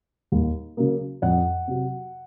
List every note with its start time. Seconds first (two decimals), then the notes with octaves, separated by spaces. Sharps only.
0.32 D#2
0.77 C#3 F#3 A#3
1.22 F2 F#5
1.67 C3 F#3